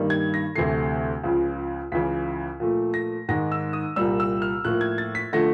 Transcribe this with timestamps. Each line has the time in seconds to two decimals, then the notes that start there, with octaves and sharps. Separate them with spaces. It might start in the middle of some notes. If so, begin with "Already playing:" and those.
Already playing: G2 D#3 G3 A#3
0.10 G#6
0.34 A#6
0.56 D2 C3 E3 A3 C7
1.24 C#2 C#3 F3
1.92 C#2 C#3 E3 B6
2.60 A#2 F3 A3
2.94 A#6
3.28 G#2 D#3 G#3 A#6
3.52 E6
3.73 D#6
3.96 C2 A#2 G3 E6
4.20 E6
4.42 F6
4.65 A2 F3 A#3 F#6
4.81 G#6
4.98 A6
5.15 B6
5.33 D3 F3 A3 A#6